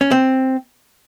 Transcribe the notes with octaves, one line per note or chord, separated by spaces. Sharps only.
C#4
C4